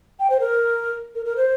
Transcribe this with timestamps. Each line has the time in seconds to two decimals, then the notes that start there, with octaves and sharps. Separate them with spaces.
0.20 G5
0.30 C5
0.40 A#4
1.15 A#4
1.25 A#4
1.37 C5